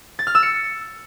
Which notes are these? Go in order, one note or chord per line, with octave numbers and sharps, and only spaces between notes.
A6
F6
E6
C#7